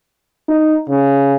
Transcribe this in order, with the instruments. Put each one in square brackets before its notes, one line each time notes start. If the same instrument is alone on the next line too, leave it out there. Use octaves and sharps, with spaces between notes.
[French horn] D#4
C#3